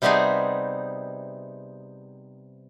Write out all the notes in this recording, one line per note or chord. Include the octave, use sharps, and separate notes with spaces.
C3 G3 B3 C4 D#4 G#4